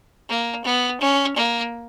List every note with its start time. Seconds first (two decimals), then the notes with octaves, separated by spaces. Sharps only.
0.29 A#3
0.64 B3
1.01 C#4
1.36 A#3